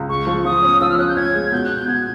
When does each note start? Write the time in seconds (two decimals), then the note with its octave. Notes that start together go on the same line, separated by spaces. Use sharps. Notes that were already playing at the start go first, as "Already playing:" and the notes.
Already playing: C#2
0.09 G#3 C#6
0.27 F3
0.45 F3 D#6
0.63 C#4
0.81 F3 E6
0.90 F6
0.98 C#4 F#6
1.08 G6
1.16 C#4 G#6
1.34 G#3
1.52 B2 G6
1.64 F#6
1.70 B2
1.76 G6
1.88 B2 G#6